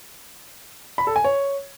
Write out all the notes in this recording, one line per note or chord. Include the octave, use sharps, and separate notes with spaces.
B5
A4
G#5
C#5